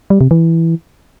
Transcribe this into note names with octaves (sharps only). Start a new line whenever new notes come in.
G3
C3
E3